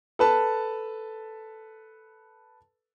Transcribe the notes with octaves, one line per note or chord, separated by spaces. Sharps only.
A4 B4 A5